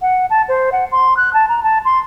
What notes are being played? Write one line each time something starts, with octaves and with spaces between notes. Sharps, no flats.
F#5
A5
C5
F#5
C6
F#6
A5
A#5
A5
C6